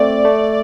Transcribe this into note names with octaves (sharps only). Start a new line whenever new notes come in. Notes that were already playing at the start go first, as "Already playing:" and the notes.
Already playing: A3 C4 D5
A3